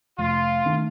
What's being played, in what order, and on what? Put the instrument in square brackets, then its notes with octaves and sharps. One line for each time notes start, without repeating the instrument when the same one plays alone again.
[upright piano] F1 [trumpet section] F4
[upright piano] D#3 A3